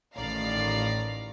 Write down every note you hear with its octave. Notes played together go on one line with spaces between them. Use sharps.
A1 A2 D#3 D5 F5 A#5